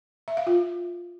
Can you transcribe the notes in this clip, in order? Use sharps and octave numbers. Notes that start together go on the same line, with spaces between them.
E5
F5
F4